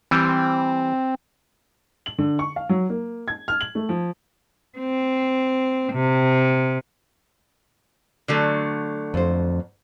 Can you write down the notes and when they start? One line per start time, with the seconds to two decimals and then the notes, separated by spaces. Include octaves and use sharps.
0.11 E3 G3 C4
2.06 F#7
2.18 D3
2.39 C#6
2.56 F5
2.69 F#3
2.90 A#3
3.28 G#6
3.48 F6
3.61 F#7
3.75 A3
3.89 F3
4.78 C4
5.92 C3
8.28 D3 F#3 A3
9.14 F2 C5